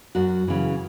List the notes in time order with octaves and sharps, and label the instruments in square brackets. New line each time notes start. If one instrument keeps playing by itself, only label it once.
[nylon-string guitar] F#2 F#4
C#3 E3